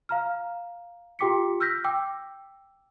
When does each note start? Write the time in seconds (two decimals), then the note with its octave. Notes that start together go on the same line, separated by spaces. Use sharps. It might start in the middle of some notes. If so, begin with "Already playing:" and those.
0.09 F5 A#5 F6
1.19 F4 G4 G5 D6 B6 C#7
1.60 E6 F6 G6 A#6 B6
1.84 G5 D6 E6